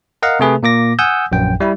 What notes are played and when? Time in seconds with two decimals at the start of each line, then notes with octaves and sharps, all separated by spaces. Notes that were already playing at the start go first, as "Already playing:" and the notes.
0.23 A#4 D#5 F5 F#5 A#5
0.40 C3 A3 G#4 B4
0.63 A#2 A#3 D6 A#6
0.99 F#5 G#5 D#6 E6 G6
1.32 A#1 F#2 G5
1.60 G3 E4